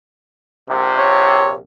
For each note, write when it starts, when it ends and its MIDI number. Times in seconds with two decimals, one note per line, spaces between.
0.69 1.58 34
0.69 1.58 48
0.98 1.51 73